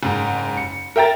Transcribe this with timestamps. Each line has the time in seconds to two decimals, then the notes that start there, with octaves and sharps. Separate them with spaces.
0.03 F#1 G#2
0.57 C#7
0.96 A#4 E5 G5 A#5 A6